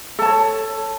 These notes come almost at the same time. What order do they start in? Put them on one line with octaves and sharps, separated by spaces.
A4 A5 C#5